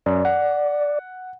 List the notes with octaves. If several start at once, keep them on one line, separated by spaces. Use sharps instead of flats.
F#2 D5
F#5